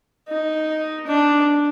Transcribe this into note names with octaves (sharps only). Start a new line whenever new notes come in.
D#4
D4